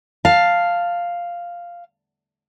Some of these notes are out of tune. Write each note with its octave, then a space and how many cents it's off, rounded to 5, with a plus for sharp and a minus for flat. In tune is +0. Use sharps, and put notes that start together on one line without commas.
F5 +0 A5 +10